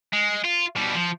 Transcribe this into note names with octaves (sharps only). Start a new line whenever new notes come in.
G#3
F4
B2 G3
F3